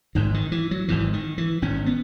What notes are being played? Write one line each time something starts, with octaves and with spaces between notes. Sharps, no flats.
G#1 G#2 D#3
D#3
E3
F#3
G#1 G#2 E3
D#3
E3
G#1 G#2 C#4
B3